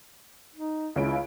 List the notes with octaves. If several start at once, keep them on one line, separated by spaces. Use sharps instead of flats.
D#4
C#2 C#3 E4 D7